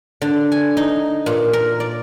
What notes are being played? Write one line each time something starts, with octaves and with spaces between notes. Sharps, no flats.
D3
G#5
D#4
A#2
A#4
D5